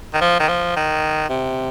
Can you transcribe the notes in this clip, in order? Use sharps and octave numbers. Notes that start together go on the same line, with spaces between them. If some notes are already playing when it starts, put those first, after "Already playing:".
D#3
F3
D#3
F3
D#3
C3